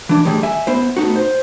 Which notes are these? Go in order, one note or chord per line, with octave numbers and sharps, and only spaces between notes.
E3 D4
A2 D#3 G3 G#4
E5 G#5
B3 E4 C5
A2 B3 D#4 F#4
C5